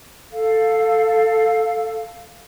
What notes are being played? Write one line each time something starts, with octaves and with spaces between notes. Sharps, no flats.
A4 F5